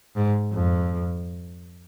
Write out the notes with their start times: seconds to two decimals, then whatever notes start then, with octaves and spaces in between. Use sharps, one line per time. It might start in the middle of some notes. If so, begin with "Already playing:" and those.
0.16 G#2
0.53 F2